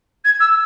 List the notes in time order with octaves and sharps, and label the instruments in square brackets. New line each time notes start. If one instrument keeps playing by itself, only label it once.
[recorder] G#6
E6